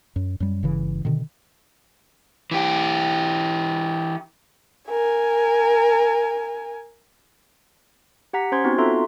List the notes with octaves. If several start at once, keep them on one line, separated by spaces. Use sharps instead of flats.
F#2
F#2 G3
G1 C#3 E3
B2 D3 D#3
E3 G4
A#4 G#5
G4 F#5 A#5 B6
C#4 C5 C6 G#6
B3 C4 D#4 F#4
F4 F#4 A4 E5 A#5 C6